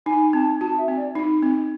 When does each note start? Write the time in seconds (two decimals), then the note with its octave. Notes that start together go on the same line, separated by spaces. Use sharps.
0.06 D#4 G#5
0.33 C4 A5
0.61 F#4 A5
0.78 E5
0.88 C4
0.97 D5
1.15 D#4
1.42 C4